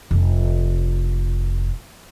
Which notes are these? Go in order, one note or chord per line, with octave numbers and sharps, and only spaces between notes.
F1 D3